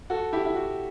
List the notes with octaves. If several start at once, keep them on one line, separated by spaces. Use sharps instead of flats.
F#4 A4
E4 G4
E4
F#4